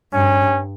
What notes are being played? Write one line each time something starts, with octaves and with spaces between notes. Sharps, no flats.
G2 C#4